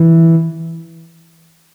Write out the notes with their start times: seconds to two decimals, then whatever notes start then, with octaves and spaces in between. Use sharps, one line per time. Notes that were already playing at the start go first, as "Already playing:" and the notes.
Already playing: E3